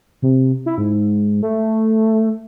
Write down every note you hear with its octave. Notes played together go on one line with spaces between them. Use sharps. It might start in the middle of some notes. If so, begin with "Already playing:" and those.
C3
E4
G#2
A3